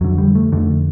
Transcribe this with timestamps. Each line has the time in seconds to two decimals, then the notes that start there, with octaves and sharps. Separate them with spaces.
0.01 F2 D3 F#3
0.18 G3
0.35 A3
0.52 F2 D3 A3